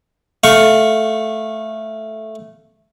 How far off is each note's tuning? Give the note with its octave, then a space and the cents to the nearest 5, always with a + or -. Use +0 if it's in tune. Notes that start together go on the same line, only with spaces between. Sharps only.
A3 -5 F5 +0 C#6 +0